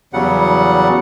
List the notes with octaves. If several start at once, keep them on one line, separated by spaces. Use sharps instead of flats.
E2 C#3 F#3 G3 F#5